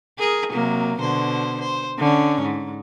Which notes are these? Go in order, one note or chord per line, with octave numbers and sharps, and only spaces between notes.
G#4 A#4
C3 F#3 A#3
B2 D3 C5
C5
D3 C#4
G#2